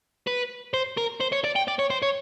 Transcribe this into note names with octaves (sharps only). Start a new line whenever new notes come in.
B4
C5
A#4
C5
C#5
D5
G5
D5
C#5
C5
C#5